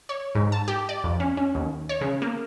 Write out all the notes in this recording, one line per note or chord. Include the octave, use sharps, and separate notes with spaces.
C#5
G#2
A5
G4
D5
F2
C#4
C#4
D#2
C#5
C#3
A#3